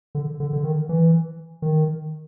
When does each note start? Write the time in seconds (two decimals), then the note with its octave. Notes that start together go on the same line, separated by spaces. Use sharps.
0.15 D3
0.40 D3
0.53 D3
0.64 D#3
0.89 E3
1.62 D#3